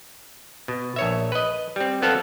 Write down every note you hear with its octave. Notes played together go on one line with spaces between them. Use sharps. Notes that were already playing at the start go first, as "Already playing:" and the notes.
B2
A#1 C#5 E5
B4 D#5
G3 C4
F#3 B3 C4 A4 F5